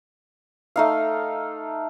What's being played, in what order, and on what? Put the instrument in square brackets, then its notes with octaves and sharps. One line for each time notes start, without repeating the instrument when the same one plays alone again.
[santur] A3 D#4 F5